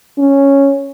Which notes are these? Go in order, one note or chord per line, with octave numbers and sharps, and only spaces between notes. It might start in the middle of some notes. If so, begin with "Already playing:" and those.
C#4